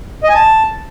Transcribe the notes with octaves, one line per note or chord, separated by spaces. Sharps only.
D#5
G#5
A5